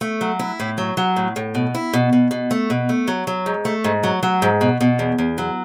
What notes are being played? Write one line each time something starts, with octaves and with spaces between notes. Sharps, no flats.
A3
F#3
E4
A2
F#3
F#3
A2
A2
B2
E4
B2
B2
B2
A3
B2
A3
F#3
F#3
G#2
A3
G#2
F#3
F#3
G#2
B2
B2
E2
E2
F#3